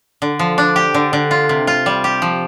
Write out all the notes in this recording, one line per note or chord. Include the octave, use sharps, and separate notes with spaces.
D3
F3
D4
G4
D3
D3
F4
C3
F4
G3
G4
F3